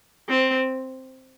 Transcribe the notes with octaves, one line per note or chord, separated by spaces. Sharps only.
C4